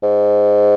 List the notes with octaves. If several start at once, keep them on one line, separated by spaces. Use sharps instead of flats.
G#2